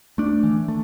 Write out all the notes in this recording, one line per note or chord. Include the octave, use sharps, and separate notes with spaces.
A3 D4
E3
A3